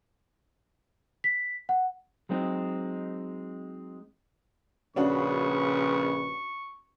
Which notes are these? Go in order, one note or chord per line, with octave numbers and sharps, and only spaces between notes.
B6
F#5
F#3 G#3 C4 D#4
A#1 C#3 C#4 D4 F#4 B4 C#6